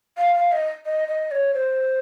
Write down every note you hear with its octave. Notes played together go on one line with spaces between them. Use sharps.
F5
F5
D#5
D#5
D#5
C#5
C5